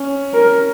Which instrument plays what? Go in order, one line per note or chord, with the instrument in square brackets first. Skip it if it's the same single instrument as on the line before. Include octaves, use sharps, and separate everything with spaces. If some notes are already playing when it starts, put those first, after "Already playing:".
Already playing: [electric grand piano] C#4
[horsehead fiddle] A#4